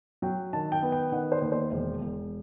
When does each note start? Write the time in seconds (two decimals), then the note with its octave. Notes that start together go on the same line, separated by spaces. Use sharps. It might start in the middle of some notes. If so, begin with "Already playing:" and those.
0.22 F#3 G5
0.53 D#3 A5
0.72 G5
0.83 B3
0.92 G5
1.12 D#3 F#5
1.32 C5
1.42 D#2
1.52 C5
1.72 E1
2.01 E1